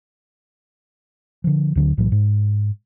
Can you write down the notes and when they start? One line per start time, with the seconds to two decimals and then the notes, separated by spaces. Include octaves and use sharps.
1.44 D3 F3
1.75 D2 D3 F#3
1.97 B1 A2 E3 F#3
2.12 G#2